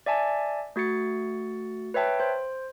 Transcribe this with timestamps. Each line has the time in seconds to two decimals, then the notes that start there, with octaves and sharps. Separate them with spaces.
0.06 D5 E5 G#5 A5
0.76 A3 F#4 A6 C#7
1.94 B4 C#5 E5 G5 A5
2.20 C5